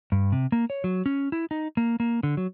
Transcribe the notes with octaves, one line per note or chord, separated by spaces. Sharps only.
G2
C3
A#3
C#5
F#3
C#4
E4
D#4
A#3
A#3
D3
F#3